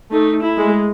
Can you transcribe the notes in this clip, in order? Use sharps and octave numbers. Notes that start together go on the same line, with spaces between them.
A3 D#4
E4
G#3